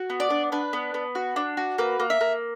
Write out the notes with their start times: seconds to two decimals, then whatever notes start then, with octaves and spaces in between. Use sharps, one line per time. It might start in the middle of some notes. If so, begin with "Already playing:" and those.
Already playing: F#4
0.10 B3
0.20 D5
0.30 D4
0.52 D4 B4
0.73 B3
0.94 B3
1.15 F#4
1.36 D4
1.57 F#4
1.78 A#3 B4
2.00 A#3
2.10 E5
2.21 A#3